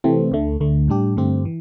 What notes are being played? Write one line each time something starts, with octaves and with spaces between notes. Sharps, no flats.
C3 E3 A3 C4
D2 D3 A3
D2 D3 A3
A2 G3 D4 G4
G2 D3 A3 C4 G4
E3